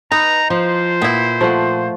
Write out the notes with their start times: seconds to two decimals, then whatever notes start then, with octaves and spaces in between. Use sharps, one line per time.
0.12 D#4 B4 A#5
0.50 F3 C5
1.02 A#2 B3 E4
1.41 F3 A3 F#5